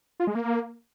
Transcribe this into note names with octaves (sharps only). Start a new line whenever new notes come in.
F4
G#3
A#3